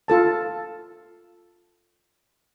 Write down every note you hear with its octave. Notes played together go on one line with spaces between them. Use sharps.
F4 A4 A5